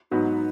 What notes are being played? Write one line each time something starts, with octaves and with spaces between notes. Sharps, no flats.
G#2 F#3 B3 D#4 F#4